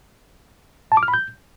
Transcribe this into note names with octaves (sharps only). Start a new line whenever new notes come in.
A5
D6
F6
B5
G6